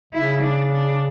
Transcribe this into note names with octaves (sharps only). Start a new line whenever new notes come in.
C#3 E4
D4
D4